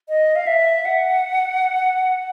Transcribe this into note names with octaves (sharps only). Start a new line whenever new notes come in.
D#5
F5
E5
F#5